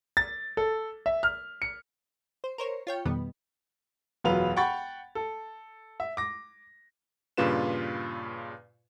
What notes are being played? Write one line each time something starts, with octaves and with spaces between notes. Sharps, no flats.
A6
A4
E5
F6
C#7
C5
A#4 C5 C#5
F4 C#5 G5
F2 B2 D#3 G3 B3
E1 F#2 F4 B4 F7
F#5 G5 B5 C#6 A6
A4
E5
D6 A#6
G2 A#2 C#3 F4 B4 E7